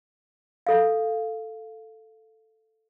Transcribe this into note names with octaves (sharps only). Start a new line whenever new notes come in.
A4 F5